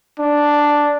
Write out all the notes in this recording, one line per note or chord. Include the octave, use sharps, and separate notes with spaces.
D4